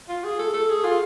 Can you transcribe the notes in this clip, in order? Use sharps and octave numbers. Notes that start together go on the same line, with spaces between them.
F4
G#4
A4
A4
G#4
F4